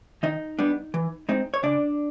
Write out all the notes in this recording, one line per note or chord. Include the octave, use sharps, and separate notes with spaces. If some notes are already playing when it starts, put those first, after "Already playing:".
D#3 D#4 D#5
G3 B3 D4
E3
G#3 C4 D#4
C#5
C#3 D4 D5